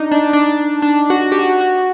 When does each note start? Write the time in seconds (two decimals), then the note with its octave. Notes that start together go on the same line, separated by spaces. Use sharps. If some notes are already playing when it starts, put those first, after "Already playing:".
Already playing: D4 D#4
0.12 D4
0.33 D4
0.82 D4
1.10 F#4
1.32 G4
1.39 F#4
1.61 F#4